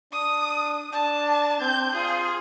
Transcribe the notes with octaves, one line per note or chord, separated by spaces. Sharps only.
D4 D#6
D4 A5
C4 G6
F4 G#4